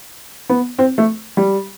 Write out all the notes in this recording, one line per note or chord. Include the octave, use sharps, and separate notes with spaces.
B3
C4
A3
G3